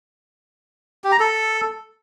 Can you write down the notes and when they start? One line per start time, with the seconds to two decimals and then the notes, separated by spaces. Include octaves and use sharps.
1.04 G4
1.12 A#5
1.20 A4